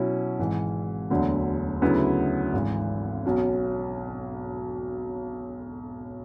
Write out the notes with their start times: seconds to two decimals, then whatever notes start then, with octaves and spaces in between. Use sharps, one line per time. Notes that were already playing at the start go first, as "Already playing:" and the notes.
Already playing: B2 F#3 C#4 E4
0.39 G#1 G#2 E3 G#3
1.10 E1 D2 D3 F#3
1.82 D2 C#3 F#3 B3 E4
2.53 G#1 G#2 E3
3.25 B1 B2 F#3 C#4